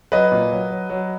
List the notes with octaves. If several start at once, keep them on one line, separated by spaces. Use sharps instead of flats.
F#3 B4 D#5
A#2
F#3
F#3
F#3